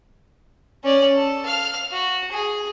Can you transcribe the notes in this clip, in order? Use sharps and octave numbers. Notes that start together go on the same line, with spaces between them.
C#4 D5
A4
F5 F6
F#4
G#4